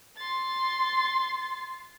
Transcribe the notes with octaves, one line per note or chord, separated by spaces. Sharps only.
C6 A6